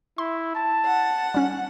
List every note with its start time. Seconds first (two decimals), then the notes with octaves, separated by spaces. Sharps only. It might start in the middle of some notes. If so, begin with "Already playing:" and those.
0.18 E4 C6
0.55 A5
0.84 F#5
1.34 G3 C#4